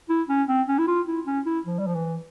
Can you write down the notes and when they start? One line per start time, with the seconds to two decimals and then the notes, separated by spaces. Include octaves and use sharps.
0.09 E4
0.29 C#4
0.48 C4
0.68 C#4
0.78 E4
0.87 F4
1.07 E4
1.26 C#4
1.46 E4
1.66 F3
1.79 G3
1.87 F3
1.95 E3